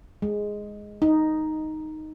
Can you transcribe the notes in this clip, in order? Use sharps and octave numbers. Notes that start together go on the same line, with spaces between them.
G#3
D#4